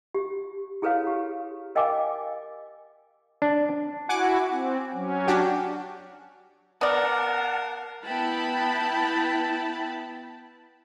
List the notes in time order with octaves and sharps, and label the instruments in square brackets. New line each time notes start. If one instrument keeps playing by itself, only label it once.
[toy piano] G4
E4 G#4 A4 B4 C#5 F5
G4
A#4 D#5 F5 G5 G#5 D6
[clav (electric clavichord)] D4
[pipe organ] E4 F#4 [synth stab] F#5 G#5 D6
[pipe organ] C4
F#3 C#4
[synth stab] D4 F#4 G4
[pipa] B3 D5 [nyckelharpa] A#4 F5 [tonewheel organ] F#5 A5
[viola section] B3 E4 G5 A5 B5